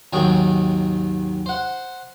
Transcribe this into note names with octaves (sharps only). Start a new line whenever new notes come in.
D#2 G#2 D#3 F#3 G#4 G5
C5 F#5